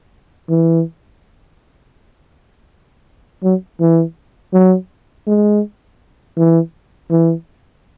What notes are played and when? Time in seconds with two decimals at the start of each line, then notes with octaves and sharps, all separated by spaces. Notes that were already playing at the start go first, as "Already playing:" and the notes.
0.49 E3
3.43 F#3
3.80 E3
4.53 F#3
5.27 G#3
6.37 E3
7.11 E3